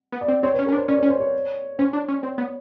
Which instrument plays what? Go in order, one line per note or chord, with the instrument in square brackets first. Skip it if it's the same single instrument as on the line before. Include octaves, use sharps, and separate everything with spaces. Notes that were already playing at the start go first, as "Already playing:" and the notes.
[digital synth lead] B3
[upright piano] D5
[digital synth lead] C4
[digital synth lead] C4 [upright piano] C#5
[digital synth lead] C#4 [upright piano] B4
[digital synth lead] C#4 [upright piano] A#4
[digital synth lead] D4
[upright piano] C5
[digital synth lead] C#4 [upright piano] D5
[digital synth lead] C#4 [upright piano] C#5
[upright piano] C5
C#5
[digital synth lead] C#4 [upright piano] C5
[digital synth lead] D4
C#4
C4
B3